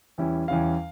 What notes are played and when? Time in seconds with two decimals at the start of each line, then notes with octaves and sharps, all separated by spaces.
0.18 E2 E3 G3 C#4 E4
0.48 E2 E3 G3 C#4 E4 F5